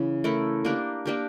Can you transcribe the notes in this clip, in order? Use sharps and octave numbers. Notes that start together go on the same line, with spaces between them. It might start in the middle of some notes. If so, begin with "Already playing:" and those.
Already playing: C#3 E3 C#4
A3 E4 A#4
A#3 D4 G4 A#4
A#3 D4 G4 A#4